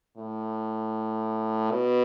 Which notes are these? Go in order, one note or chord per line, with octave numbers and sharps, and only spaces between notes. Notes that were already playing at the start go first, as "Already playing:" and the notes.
A2
B2